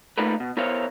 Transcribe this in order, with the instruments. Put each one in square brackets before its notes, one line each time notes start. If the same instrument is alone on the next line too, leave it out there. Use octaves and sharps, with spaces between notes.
[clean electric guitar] A3 A#3 D#4 F4 A#4 B4
B2
B3 E4 A#4 C5 C#5 F5